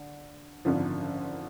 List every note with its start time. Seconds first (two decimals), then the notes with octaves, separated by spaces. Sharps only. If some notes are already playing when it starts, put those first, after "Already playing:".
Already playing: D3
0.65 G#1 F#2 D3 F3